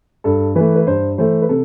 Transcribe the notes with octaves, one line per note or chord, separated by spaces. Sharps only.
G2 A4
E3 A3 B4
B4
G2 C5
E3 A3 C5
B4
C3 A4